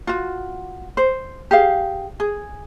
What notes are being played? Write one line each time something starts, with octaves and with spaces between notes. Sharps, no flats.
F4 F#4
C5
G4 G#4 F5
G#4